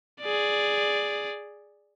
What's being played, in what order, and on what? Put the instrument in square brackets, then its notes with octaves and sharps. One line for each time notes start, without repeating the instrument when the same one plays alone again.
[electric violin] G#4 D5